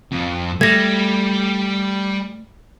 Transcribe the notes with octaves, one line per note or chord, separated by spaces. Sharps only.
F2
G3 A3 G#6 A#6